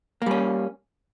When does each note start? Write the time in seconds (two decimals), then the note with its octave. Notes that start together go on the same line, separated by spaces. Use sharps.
0.22 A#3
0.26 G3
0.31 C#4